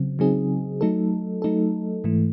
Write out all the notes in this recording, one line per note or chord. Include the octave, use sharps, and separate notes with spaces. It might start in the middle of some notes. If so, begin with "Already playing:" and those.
Already playing: C#3 F#3 C4
C#3 F#3 C4 D#4 G#4
F#3 A3 D#4 A4
F#3 A3 D#4 A4
G#2 E3 A3